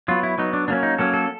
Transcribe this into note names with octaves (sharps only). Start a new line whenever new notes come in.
F#3 B3 F4
E4
F#3 B3 D#4
D4
F#3 A#3 C#4 D4
D#4
F#3 A#3 C#4 A4
A4